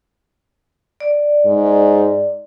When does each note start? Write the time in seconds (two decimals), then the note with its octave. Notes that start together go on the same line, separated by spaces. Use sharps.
1.00 D5
1.46 G#2